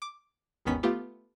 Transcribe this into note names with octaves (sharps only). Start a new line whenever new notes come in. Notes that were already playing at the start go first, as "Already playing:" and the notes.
D6
G#1 D#2 D#3 B3 C#4 B6
A3 B3 F4 G4